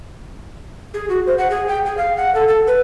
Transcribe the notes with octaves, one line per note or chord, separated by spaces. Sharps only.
G#4
F#4
C5
F#5
G#4
G5
G#4
F5
F#5
A4
A4
B4